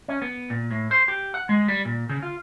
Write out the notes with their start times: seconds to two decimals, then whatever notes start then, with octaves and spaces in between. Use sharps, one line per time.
0.08 C#4
0.22 B3
0.50 A#2
0.71 A2
0.91 C5
1.08 G4
1.34 F#5
1.49 G#3
1.68 G3
1.85 A#2
2.09 C#3
2.22 F4